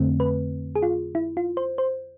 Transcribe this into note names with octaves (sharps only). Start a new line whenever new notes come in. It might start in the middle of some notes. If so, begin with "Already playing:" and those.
Already playing: F2 D3 A3 C4
B4
G#4
F4
E4
F4
C5
C5